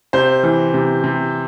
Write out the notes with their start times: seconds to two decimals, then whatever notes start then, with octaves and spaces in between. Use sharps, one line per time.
0.13 C3 C5
0.43 E3
0.74 C3
1.04 C3